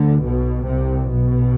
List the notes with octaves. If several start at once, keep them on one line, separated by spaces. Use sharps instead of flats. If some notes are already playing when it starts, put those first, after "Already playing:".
Already playing: D2 D3
B1 B2
C2 C3
B1 B2